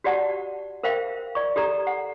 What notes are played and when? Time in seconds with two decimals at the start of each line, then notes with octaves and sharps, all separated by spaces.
0.04 F#4 G4 D5 F#5 A5
0.83 A#4 C5 E5 F5 G5
1.35 D5 C#6
1.56 G4 A4 D5 A#5
1.87 F#5